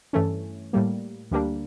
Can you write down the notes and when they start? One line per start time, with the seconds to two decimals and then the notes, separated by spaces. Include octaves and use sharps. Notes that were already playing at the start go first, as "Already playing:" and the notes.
0.13 G2 E3 A3 C#4
0.73 A2 G3 A#3
1.31 D2 D3 G3 A#3 D4